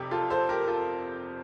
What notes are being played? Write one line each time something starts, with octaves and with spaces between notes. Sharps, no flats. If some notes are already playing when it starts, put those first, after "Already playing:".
Already playing: F1 F2 C3 G4
F4 A4
A4 C5
G4 A#4
F4 A4